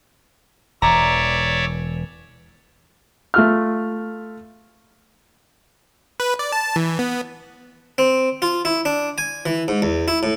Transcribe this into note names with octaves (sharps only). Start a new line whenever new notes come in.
E1 E3 C#5 D5 E5 A#5
A3 F4 F6
B4
D5
A5
E3
B3
C4
F4
E4
D4
G#5
E3
G#2
E2
E4
A2